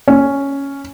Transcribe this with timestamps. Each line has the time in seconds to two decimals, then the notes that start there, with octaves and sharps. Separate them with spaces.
0.08 C#4